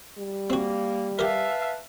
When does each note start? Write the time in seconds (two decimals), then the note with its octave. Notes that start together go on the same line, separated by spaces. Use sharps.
0.18 G3
0.50 A#3 C4 F#4
1.19 G4 A#4 B4 E5 F5 A5